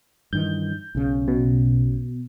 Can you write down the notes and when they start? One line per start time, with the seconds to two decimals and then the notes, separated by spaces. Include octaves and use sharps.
0.33 G2 D#3 E3 G6
0.95 B1 C#3
1.28 B2